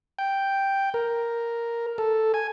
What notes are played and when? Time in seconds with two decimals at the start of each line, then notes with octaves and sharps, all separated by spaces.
0.19 G5
0.94 A#4
1.98 A4
2.34 G#5